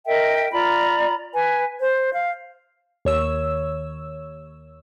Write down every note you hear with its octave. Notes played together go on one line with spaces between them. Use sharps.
A#4 D#5 E5 G5
F4 D5 A#5 B5
B4 G#5
C5
F5
D#2 C#5 E6